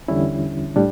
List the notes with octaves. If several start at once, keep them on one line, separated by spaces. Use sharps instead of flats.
E2 D3 G3 C#4 E4
A2 G3 D4